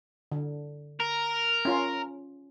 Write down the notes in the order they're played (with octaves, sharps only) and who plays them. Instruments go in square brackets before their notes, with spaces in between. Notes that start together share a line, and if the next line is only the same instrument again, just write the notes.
[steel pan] D3
[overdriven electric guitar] A#4
[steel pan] C#4 F4